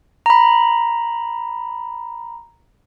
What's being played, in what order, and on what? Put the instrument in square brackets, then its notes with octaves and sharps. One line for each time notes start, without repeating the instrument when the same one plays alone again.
[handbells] A#5 B5